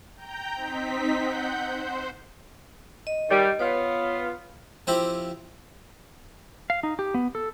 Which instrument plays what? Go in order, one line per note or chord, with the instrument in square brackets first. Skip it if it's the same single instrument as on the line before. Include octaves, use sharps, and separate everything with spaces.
[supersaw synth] G5 A#5 G6
C4 D#4 B6
F#5 G6
C5
[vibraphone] D#5
[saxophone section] D#3 G3
[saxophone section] B3 F4 [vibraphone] B4 C#5
[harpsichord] F3 C4 E4 G4
[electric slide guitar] F5
D#4
G4
B3
A4